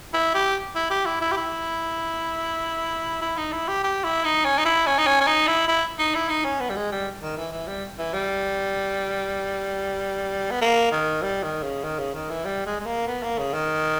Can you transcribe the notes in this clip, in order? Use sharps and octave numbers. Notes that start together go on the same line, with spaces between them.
E4
G4
E4
G4
E4
E4
G4
E4
E4
D#4
E4
G4
G4
E4
D#4
C#4
D#4
E4
C#4
D#4
C#4
C#4
D#4
E4
E4
D#4
E4
D#4
C#4
B3
G3
G#3
G3
D#3
E3
E3
G3
E3
G3
B3
A#3
D#3
G3
D#3
C#3
D#3
C#3
D#3
E3
G3
G#3
G#3
A#3
B3
A#3
C#3
D#3